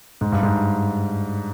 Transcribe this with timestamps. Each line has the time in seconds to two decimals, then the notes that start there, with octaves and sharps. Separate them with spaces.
0.21 G#2
0.32 G2
0.43 G#2